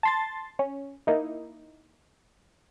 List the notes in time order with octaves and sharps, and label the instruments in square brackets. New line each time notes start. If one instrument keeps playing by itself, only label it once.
[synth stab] A5 C6 A6
C#4
A#3 D#4 E4